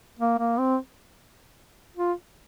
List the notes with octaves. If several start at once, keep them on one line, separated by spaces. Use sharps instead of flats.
A#3
A#3
C4
F4